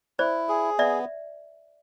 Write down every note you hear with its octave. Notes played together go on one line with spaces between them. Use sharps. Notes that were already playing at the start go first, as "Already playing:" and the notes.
E4 C5 D5
G#4
B3 D5 E5